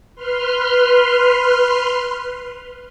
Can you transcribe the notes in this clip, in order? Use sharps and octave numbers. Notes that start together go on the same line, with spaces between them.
B4 C6 F6